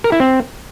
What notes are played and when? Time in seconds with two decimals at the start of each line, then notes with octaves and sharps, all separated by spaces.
0.04 A#4
0.12 E4
0.20 C4